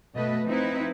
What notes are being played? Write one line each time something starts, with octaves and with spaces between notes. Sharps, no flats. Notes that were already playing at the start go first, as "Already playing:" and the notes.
B2 A3 B4 D#5
F3 C4 D#4 E4 B4